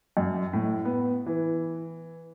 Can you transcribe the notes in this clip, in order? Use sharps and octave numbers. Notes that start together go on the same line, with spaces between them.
F#2
A2
B3
E3